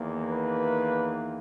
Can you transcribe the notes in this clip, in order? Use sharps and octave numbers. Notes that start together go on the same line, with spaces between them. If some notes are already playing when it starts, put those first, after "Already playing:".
Already playing: E2 D#3 A#3
B4